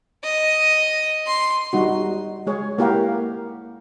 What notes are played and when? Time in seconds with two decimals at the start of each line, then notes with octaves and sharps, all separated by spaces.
0.24 D#5
1.27 C6
1.73 G3 D#4 F#4
2.47 G#3 G#4 C#5
2.78 A#3 E4 G4 A#4 F5 F#5